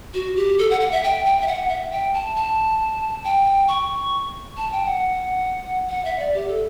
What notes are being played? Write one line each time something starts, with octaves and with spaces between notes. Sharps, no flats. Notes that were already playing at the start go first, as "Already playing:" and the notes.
F#4
G4
A4
F#5
F#5
E5
G5
G5
E5
F#5
E5
G5
A5
A5
G5
C#6
A5
G5
F#5
F#5
E5
D5
G4
A4